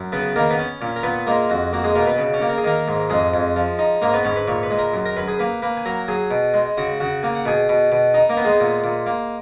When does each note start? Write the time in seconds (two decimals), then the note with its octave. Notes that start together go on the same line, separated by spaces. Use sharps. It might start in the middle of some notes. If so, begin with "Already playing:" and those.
Already playing: F#2
0.12 C#3 B3 B4
0.36 D#3 A#3 A#4
0.50 B3 B4
0.59 C#4
0.81 A#2 C#4 C#5
0.96 A#4
1.04 A#2 B3 B4
1.27 G#3 A#3 A#4
1.50 F2 F#4
1.73 A#3 F#4
1.84 G#3 G#4
1.95 B2 A#3 A#4
2.07 B3 B4
2.18 C#3
2.34 C#4 C#5
2.41 A#3
2.49 A#4
2.58 G#4
2.64 D#3 A#3 A#4
2.88 G#2
3.10 F2 G#3 G#4
3.34 F2
3.56 F3
3.79 D#4
4.02 G#2 A#3 A#4
4.14 B3 B4
4.25 G#2 C#4 C#5
4.36 B4 B5
4.48 A#2 C#5 C#6
4.63 B4 B5
4.71 G#3
4.79 A#4 A#5
4.94 F#2
5.06 A#4 A#5
5.17 F#2 B4 B5
5.28 G#4 G#5
5.39 A#3 B4 B5
5.62 A#3 B4 B5
5.77 G#5
5.85 F#3 A#4 A#5
6.08 F#3 G#4 G#5
6.31 B2
6.54 G#3
6.77 C#3 F#4 F#5
7.00 C#3 F#4 F#5
7.23 A#3 G#5
7.35 F#5
7.46 B2 G#4 G#5
7.69 B2
7.92 B2
8.14 D#4
8.30 A#3 A#4
8.37 B3
8.45 G#3 G#4
8.60 A#2
8.84 A#2
9.06 A#3